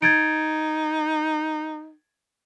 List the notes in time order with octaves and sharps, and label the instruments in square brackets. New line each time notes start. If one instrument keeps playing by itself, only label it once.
[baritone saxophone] D#4 [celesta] G#6 A6 D7